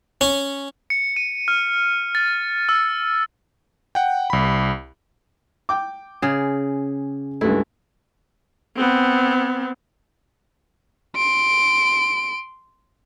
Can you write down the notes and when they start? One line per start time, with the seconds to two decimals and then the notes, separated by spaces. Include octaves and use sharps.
0.21 C#4
0.90 C#7
1.16 D#7
1.48 F6
2.15 A6
2.69 E6
3.95 F#5 G5
4.30 C2 B5
5.69 G5 D6
6.22 C#3 G#4
7.41 C#2 G2 A3 E4
8.77 B3 C4
11.16 C6 D7